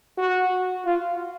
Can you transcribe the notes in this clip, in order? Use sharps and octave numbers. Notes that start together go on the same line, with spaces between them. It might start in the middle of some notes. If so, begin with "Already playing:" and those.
F#4
F4